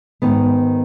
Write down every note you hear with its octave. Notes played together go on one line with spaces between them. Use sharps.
G#2 D#3 B3